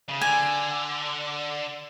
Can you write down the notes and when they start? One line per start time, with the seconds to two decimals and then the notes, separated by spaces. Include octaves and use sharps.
0.09 C#3
0.21 D3 G#5